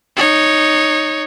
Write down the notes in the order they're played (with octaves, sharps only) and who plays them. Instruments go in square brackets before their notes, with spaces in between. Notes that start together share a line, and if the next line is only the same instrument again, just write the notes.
[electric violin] D#4 C#5